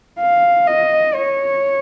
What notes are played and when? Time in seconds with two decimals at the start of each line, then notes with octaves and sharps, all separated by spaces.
0.20 F5
0.67 D#5
1.15 C#5